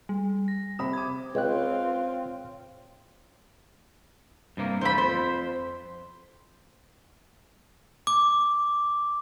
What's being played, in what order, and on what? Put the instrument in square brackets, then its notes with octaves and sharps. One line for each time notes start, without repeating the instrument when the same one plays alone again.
[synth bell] G3
A#6
[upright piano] C3 C5 B5 [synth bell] D#6
[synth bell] D6 G#6
[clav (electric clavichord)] C#2 [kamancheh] C4 F4 [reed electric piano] C#5 G5 F#6
[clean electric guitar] G2 C3 A#3
[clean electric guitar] E2 A3 [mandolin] C5 B5
[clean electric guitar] F2 [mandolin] C5
[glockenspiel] D6